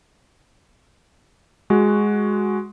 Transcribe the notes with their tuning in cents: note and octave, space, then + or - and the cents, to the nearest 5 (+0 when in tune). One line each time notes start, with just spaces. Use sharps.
G#3 +0 F#4 +0